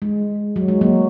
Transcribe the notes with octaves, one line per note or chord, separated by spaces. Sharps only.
G#3
F#3
G#3
F#3 A#3